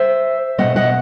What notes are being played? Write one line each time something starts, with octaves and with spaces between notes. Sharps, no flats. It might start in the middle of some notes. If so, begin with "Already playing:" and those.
Already playing: C5 E5
B2 A3 D#5 F#5
D#5 F#5